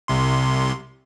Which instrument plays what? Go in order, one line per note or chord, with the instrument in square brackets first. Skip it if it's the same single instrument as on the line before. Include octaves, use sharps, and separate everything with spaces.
[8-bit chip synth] C2 C3 C6